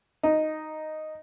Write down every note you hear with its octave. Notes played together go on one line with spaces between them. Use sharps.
D#4